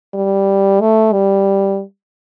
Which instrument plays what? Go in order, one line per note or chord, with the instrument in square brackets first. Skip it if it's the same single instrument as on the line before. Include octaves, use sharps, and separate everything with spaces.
[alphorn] G3
A3
G3